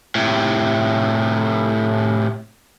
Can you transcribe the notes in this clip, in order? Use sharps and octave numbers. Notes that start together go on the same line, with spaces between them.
A2 C3